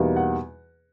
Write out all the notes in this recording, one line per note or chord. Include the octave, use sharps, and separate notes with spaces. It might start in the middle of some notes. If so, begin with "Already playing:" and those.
Already playing: E2 B2 G3 A#3 D#4
F#5